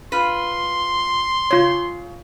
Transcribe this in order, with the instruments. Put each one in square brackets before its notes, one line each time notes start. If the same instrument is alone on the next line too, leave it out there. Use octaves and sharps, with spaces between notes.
[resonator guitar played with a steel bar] F4 B4 [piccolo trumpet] C6
[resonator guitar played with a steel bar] C#3 [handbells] F4 C#5